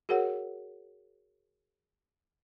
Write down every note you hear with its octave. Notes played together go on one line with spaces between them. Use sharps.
F#4 G#4 A#4 C#5 F#5